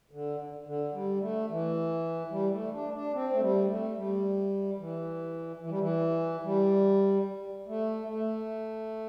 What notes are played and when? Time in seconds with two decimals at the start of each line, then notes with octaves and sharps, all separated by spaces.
0.11 D3
0.66 D3
0.94 G3
1.21 A3
1.49 E3
2.31 G3
2.51 A3
2.73 D4
2.94 D4
3.13 C4
3.33 A3
3.41 G3
3.69 A3
3.96 G3
4.78 E3
5.61 E3
5.70 G3
5.78 E3
6.44 G3
7.67 A3
8.08 A3